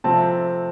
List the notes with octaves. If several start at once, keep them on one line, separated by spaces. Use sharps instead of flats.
C3 F3 A3 C4 A5